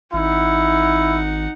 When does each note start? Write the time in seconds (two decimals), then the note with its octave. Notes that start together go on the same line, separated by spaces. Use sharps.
0.14 G#1 D#4 E4 F#5